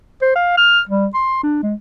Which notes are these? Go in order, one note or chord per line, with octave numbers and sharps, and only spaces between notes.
C5
F5
F6
G3
C6
D4
G#3